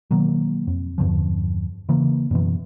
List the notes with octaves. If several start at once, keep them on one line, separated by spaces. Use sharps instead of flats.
B2 D#3 F#3 A#3
F2
E2 G2 D3 F3
C#3 E3 A#3
F#2 B2 E3